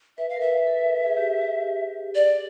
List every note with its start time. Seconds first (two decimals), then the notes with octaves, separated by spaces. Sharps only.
0.18 B4 E5
0.29 F5
0.36 A#4
0.40 B4 E5
0.67 A4
1.06 G#4
1.17 G4
1.41 G4
2.15 D5